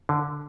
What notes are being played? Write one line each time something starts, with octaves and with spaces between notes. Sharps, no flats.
D3